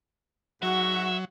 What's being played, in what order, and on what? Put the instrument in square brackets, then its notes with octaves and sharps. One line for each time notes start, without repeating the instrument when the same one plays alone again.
[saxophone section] G#2 F#4 [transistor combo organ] F#3 [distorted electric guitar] E5